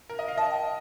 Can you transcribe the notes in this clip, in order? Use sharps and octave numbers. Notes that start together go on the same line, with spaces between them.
A#4
D#5
F5
D#5 A5
G5